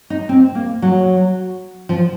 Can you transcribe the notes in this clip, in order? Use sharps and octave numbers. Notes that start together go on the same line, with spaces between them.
D#4
C4
A#3
F#3
F3